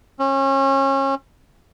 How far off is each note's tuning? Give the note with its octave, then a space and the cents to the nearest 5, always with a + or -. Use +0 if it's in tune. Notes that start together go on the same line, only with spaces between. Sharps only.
C#4 -30